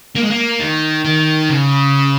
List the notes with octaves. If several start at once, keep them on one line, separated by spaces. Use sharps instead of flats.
A#3
G#3
A#3
D#3
D#3
C#3